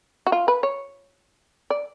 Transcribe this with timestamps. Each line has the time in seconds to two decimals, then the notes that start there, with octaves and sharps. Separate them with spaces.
0.26 F#4
0.32 F4
0.48 B4
0.63 C#5
1.70 D5